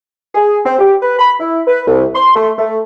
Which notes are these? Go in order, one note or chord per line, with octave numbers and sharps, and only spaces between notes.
G#4
C4
G4
B4
B5
E4
B4
C2
C6
A3
A3